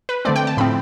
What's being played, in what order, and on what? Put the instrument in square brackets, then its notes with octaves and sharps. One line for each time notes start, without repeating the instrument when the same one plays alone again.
[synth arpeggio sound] B4
D3 A3 C4 D5
G5
A5
A2 F3 C4 B5